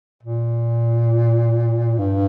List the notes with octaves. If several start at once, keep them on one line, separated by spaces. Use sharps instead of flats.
A#2
G2